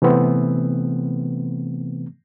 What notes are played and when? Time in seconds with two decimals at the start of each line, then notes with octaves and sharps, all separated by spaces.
0.02 C3 E3 A3 B3 C4